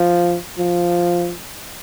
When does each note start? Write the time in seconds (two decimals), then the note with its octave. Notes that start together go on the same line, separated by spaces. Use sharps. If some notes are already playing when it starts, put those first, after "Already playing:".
Already playing: F3
0.58 F3